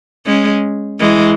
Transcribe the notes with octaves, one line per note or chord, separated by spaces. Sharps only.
G#3 C#4
E3 G#3